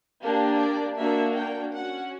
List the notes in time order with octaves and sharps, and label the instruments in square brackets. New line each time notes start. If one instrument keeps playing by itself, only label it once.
[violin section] A#3 D4 G4
D5
A#3 D4 F#4 E5
G5
C#4 F#4 F#5